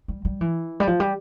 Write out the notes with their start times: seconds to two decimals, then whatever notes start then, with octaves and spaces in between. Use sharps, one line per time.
0.08 G3
0.25 G3
0.41 E3
0.80 G3
0.87 F3
1.00 G3